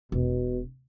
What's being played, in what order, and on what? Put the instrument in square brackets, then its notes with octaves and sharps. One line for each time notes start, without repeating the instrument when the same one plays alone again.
[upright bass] E1 [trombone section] B2